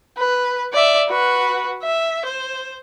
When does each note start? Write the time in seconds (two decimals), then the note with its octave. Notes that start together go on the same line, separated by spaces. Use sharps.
0.18 B4
0.73 D5 E5
1.09 F#4 B4
1.83 E5
2.25 C5